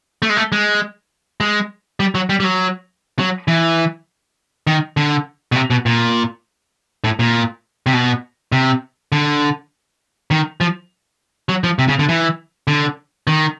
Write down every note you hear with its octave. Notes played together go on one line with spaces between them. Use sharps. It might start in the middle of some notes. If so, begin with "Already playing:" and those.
A3
G#3
A3
G#3
G#3
G3
F#3
G3
G3
F#3
F#3
E3
D#3
D3
B2
C3
B2
A#2
A2
A#2
C3
B2
C3
D3
D#3
F3
F#3
F3
C3
C#3
D3
E3
D3
D#3